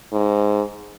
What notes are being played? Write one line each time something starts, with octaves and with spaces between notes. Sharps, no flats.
G#2